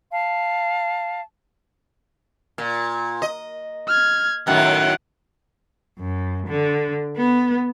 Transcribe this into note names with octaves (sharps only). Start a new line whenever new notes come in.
F5 A5
A#2
D#5
F6 G#6
F#2 A2 D#3 F#5
F#2
D3
B3